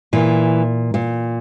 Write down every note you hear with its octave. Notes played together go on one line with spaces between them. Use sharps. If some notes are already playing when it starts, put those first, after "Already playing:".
A#2 E3
A#2